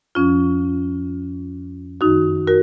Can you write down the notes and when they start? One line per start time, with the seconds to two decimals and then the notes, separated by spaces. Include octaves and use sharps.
0.15 F2 F3 C#4 F4
2.01 F#2 D#3 D#4 F#4
2.48 F#4 A#4